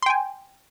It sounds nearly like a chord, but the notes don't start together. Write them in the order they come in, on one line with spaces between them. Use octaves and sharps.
C6 G5 G#5